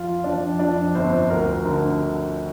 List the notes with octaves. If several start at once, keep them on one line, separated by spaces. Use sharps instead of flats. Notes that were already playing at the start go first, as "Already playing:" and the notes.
Already playing: F2 F4 F5
F2 D4 D5
F2 D4 D5
G1 C4 C5
D2 A#4
D3 A#4